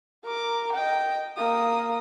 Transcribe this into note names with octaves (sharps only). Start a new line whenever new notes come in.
A#4 D6
D#5 G5
A#3 D#6